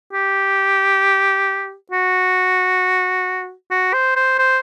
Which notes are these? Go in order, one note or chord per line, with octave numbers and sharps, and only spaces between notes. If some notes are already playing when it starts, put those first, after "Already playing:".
G4
F#4
F#4
C5
C5
C5